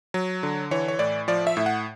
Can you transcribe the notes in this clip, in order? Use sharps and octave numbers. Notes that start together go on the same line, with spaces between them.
F#3
D3
E3 C#5
C#5
A2 D5
F3 D5
E5
A2
F#5